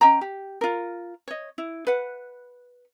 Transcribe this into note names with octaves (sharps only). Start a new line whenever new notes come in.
C#4 D#5 G5 A#5
G4
F4 A#4
C#5 D#5
E4
B4 F#5